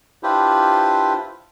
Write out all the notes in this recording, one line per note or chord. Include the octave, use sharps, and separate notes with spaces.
D4 E4 F4 G4 B4 C5